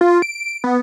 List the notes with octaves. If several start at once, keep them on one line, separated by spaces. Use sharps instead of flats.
F4
D7
B3